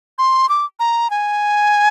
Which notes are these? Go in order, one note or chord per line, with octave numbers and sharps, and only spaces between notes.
C6
D6
A#5
G#5